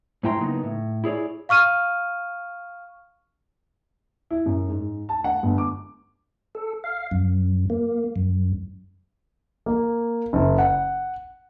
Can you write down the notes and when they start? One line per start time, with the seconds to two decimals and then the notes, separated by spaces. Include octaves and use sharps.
0.23 G#2 A3 E4 G5 A#5 C6
0.41 C#3 F#3 A#3 B3 D#4
0.63 A2
1.04 E4 G#4 C#5 D5
1.49 F5 C#6 F6 D#7
4.31 E4
4.46 F#2
4.68 G#2
5.09 A5
5.24 F#5
5.43 G1
5.58 D6
6.55 A4
6.84 F5
7.11 F#2
7.70 A#3
8.16 F#2
9.66 A#3
10.33 F#1
10.58 F#5